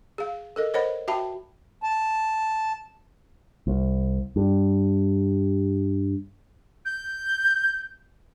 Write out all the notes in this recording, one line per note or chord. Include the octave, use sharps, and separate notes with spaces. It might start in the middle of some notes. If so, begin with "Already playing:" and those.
G#4 F5
A4 A#4 D#5
A#4 C5 C#5 D#5 F#5 B5
F#4 E5 G5 A5 B5
A5
C2
G2
G6